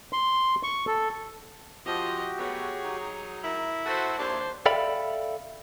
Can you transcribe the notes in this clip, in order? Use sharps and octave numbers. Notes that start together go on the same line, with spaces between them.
C6
C#6
A4
F3 F#4 G4 D#5
F#3 A3 B3 G#4 C#5
F#3 D#4
E4 A#4
A3 F#4 C5 F#5 A5
D#2 D4 E4 C5 C#5
A4 D5 E5 F5 G5 B5